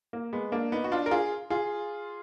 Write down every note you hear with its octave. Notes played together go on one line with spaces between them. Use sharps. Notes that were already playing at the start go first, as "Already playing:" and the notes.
A#3
G#3 B3
A#3 D4
B3 D#4
F#4
D4 F4
A#4
F4 G#4
F4 G#4